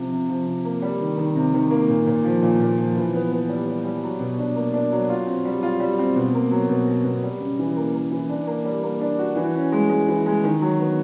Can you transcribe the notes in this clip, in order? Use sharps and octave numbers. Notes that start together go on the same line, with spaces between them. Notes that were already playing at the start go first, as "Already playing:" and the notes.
Already playing: C3 F3
C3
F3
C3
A#3
G3
D#3
D#3
C3
D#3
A#3
A#2
A#2
F3
A#2
A#2
F3
E3
B3
B3
G3
G3
G3
F#3
B2
D4
A#3
D4
F#3
F4
C4
G3
F4
G3
C4
B2
A#3
F#3
B2
B2
B2
G3
C#3
E3
A#3
A#3
E3
D4
A#3
G3
A#3
D4
F#4
E3
C#4
G#3
G#3
E3
G#3
D#3
F#3
B3